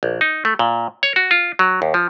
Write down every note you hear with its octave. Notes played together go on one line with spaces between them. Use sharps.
A#1
D#4
A3
A#2
C#5
F#4
F4
F#3
D#2
F3